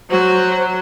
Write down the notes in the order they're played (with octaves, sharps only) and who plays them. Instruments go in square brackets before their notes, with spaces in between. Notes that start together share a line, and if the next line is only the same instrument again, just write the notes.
[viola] F#3 [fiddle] F#4 [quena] C5